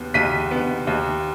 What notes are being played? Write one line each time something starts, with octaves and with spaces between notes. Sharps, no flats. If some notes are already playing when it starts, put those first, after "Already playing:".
Already playing: D#2 B3
D#2 B6 D#7
B3
D#2